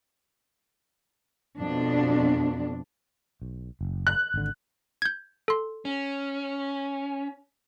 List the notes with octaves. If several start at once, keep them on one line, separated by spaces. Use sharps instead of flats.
F2 B2 D4
B1
F#1
F#6
G#1 D3
G6 G#6
A4 C6
C#4